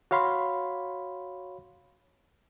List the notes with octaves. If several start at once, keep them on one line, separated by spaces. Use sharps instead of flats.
F#4 C#5 F5 B5 C6